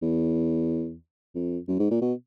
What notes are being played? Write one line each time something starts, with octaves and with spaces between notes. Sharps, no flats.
E2
F2
F#2
G#2
A#2
B2